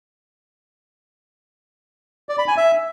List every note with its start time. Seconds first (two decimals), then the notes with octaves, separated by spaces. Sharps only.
2.29 D5
2.38 B5
2.48 G#5
2.57 E5